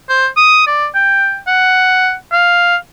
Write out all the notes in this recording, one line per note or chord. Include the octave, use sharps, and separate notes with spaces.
C5
D#6
D5
G5
F#5
F5